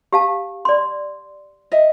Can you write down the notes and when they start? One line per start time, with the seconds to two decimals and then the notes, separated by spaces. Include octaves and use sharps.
0.13 G4 F5 A5
0.65 D5 C6
1.72 D#5 E5